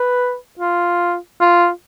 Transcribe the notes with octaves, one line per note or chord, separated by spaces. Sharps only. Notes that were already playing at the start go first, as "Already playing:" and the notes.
Already playing: B4
F4
F4